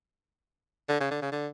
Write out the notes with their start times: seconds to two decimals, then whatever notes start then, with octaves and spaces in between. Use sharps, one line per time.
0.89 D3
1.00 C#3
1.11 D3
1.22 C#3
1.32 D3